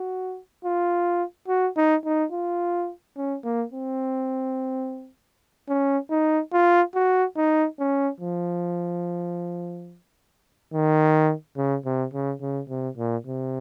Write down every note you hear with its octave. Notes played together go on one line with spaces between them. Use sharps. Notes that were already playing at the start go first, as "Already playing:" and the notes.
Already playing: F#4
F4
F#4
D#4
D#4
F4
C#4
A#3
C4
C#4
D#4
F4
F#4
D#4
C#4
F3
D#3
C#3
C3
C#3
C#3
C3
A#2
C3